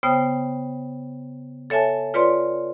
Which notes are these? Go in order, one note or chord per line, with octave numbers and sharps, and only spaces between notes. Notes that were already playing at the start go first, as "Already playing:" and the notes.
C#3 B3 C5 G5 D#6
A4 C#5 E5 G#5 A5
F4 B4 C#5 D5 C6